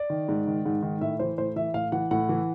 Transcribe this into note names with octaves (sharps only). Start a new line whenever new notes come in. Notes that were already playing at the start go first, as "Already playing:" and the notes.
Already playing: D5
D#3
G#2
D#3
G#2
D#3
A2 E5
E3 C5
A2 C5
E3 E5
A2 F5
E3 F#5
A2 F#5
E3